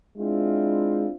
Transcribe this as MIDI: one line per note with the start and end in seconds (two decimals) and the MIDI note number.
0.18 1.06 56
0.18 1.14 60
0.18 1.14 62
0.18 1.14 64
0.18 1.14 65